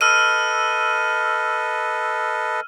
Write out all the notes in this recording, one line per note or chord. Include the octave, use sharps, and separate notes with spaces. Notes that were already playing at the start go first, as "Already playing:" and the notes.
A4 B4 D#5 E6 F6 D#7